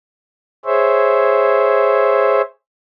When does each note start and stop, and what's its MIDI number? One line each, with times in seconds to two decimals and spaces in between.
0.65 2.41 68
0.65 2.41 72
0.65 2.41 73
0.65 2.41 76